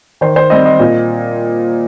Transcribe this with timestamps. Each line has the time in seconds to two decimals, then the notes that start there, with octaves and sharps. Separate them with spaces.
0.21 D#3 C5
0.36 C5
0.50 G3 C4 D#5
0.66 D#5
0.80 A#2